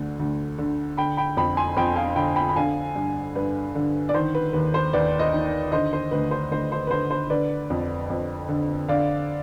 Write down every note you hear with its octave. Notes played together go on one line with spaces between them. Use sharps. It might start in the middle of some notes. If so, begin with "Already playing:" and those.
Already playing: D2 D3
D2
D3
D3 G5 B5
G5 B5
F2 G5 B5
G#5 C6
F2 G5 B5
F5 G#5
D3 G5 B5
G5 B5
B5
D3 F5 G#5
G2
G2 B4
D3
D5
D#3 C5
B4
D#2 B4
C5
D#2 B4 D5
C5 D#5
D#3
D3 C5 D#5
C5
D2 B4
C5
D2 C5
C5
B4
D3 C5
C5
D3 B4 D5
F2
F2
D3
D3 D5 F5